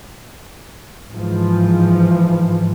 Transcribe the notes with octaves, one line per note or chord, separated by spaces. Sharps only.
G#2 E3 F3